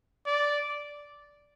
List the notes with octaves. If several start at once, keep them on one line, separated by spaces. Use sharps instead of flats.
D5